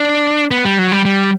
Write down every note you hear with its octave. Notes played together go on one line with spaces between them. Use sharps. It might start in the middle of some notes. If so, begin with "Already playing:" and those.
Already playing: D4
B3
G3
F#3
G3
G3